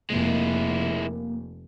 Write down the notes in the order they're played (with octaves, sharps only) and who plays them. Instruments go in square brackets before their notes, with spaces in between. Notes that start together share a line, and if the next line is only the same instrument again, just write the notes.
[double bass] F1 [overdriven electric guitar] G#3 E4 [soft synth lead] A#3